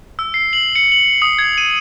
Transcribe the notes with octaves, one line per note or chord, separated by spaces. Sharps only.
E6
C7
F#7
C#7
F#7
D#6
G#6
D#7